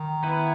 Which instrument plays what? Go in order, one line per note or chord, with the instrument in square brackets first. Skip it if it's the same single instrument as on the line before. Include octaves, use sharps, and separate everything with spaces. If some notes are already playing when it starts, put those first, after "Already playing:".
Already playing: [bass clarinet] D#3
[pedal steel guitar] B3 E4 B4